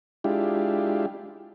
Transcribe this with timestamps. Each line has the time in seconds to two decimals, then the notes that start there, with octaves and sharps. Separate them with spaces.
0.24 G#3 D4 E4 F4 G4